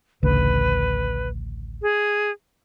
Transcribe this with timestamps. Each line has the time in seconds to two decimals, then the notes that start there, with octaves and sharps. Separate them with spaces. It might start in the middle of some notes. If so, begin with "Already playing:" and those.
0.23 A1 D2 C#3 B4
1.82 G#4